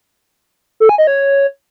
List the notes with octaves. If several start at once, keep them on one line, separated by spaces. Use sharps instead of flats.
A4
G#5
D#5
C#5